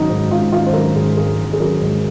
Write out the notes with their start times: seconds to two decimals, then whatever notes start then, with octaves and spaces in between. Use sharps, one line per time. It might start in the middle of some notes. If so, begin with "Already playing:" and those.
Already playing: G#1 D#3 F#3 D#4
0.10 G#2
0.31 G#1 F4
0.52 D#3 F4
0.67 C5
0.73 F#3 A#4
0.95 G#2 G#4
1.17 G#1 G#4
1.39 D#3
1.53 G#4
1.60 F#3 A#4
1.81 G#2